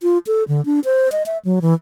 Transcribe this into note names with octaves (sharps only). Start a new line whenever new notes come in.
F4
A4
D3
D4
C5
D#5
E5
F#3
E3